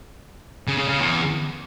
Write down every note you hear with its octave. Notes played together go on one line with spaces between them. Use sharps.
C#3
C#3
C#3
E2